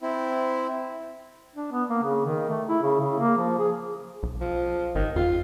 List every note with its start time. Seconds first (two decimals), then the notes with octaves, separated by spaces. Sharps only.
0.02 C4 E4
1.55 D4
1.72 B3
1.90 A#3
2.03 C#3
2.25 D#3
2.49 A3
2.69 E4
2.82 C#3
3.01 C#3
3.19 A#3
3.37 F3
3.58 G#4
4.23 B1
4.41 F3
4.95 G#1 D#3
5.16 F2 F4